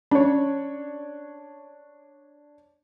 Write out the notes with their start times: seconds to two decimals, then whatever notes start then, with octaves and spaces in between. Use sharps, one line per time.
0.12 C#4 D4 C#5